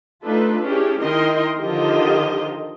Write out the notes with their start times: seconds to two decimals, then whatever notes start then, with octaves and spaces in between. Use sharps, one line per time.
0.25 A3 D4 D#4 F4 A4 B4
0.62 C#4 D4 E4 G4 G#4
1.01 D#3 E4 A#4 D#5 G5 C6
1.60 D3 D#3 F3 F4 G4 D#5